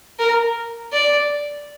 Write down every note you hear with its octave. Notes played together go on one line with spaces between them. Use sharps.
A#4
D5